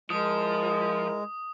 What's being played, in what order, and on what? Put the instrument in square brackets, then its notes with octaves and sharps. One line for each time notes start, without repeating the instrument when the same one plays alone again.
[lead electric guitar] F3 [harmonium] G#3 [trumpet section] E4 A#4 [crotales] D#6